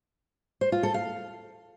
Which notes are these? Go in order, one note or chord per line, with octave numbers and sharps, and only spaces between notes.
C5
F4
A4
F5